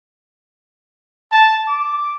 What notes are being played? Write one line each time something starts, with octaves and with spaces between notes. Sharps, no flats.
A5
D6